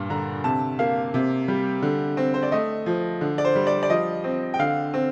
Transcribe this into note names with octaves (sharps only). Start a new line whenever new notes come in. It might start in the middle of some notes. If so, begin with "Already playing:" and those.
Already playing: G2 A#2
D3 A#5
C3 A5
A#3 F5
C3
G3
D3
C4
C5
D5
A3 D#5
F3
D3
D5
C5
G3
D5
D5
F3 D#5
C4
G5
D3 F5
C4